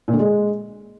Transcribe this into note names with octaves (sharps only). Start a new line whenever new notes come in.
A#2
D3
G#3